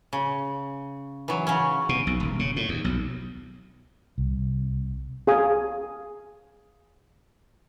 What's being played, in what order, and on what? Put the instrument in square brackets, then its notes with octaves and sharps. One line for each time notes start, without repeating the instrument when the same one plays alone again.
[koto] C#3
E3 F#3
C#3 F#3 C#4
[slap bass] B2
B1
D#1
C#3
A2
D#2
B1
[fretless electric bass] C2
[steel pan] G#4 F5 G#5 D#6